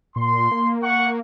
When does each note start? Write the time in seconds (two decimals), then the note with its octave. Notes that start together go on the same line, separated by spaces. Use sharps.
0.16 A#2 C6
0.51 A#3
0.83 F#5 C#6